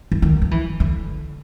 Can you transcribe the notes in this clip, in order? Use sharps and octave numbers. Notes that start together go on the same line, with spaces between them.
E3
D#3
F3
E3
D3